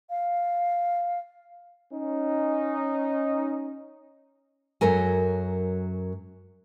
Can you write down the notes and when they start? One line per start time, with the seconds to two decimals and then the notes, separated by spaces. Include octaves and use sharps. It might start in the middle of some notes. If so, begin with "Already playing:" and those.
0.10 F5
1.92 C#4 D#4
4.81 F#2 F#3 A4 A#4 G#5